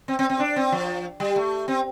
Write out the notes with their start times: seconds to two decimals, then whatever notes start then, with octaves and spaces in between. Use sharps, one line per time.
0.08 C4
0.19 C4
0.30 C4
0.40 D4
0.56 C4
0.72 F3
1.20 G3
1.36 A3
1.68 C4